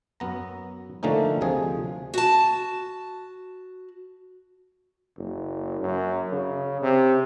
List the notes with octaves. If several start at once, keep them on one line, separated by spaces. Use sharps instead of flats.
F#2 B3 A#5
D3 F3 A3 A#3 C#4 D#4
D2 C3 F3 G#4
F#4 A5
F#1
F#2
C#3
C3